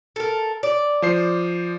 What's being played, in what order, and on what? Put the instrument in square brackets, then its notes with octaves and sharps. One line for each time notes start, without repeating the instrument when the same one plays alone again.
[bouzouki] A4 A#4
D5
[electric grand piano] F3 C5 C7